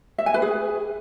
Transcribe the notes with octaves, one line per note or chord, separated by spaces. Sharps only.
E5
G#5
B4
G#4